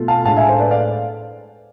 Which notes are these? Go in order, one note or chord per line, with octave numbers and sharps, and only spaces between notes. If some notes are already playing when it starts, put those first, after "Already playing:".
Already playing: B2 A3 F4
F5 A5
A2 G#3 D4 F5 A5
E5 G#5
C5
B4 D5
D5 F5